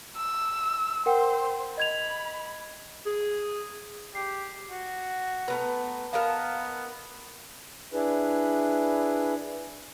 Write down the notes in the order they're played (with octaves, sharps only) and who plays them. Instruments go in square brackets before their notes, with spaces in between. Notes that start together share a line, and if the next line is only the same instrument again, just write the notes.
[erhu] E6
[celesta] A#4 F#5 G5 [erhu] C5
[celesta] D#5 G#6 F7 [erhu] B5
[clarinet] G#4
[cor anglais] G4 [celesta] C7
[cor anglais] F#4
[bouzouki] A3 B3 A#5 [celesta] B4
[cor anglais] B3 [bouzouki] A#4 D#5 A5 [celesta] F5
[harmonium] D4 E4 G#4 B4